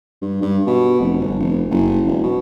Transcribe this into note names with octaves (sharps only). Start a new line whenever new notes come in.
G2
G2
B2
F1
G1
F1
F#1
E1
B2